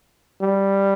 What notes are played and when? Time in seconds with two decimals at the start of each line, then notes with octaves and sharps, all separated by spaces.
0.41 G3